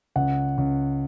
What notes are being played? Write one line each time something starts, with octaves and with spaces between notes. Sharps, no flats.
C#2 F#5
C#2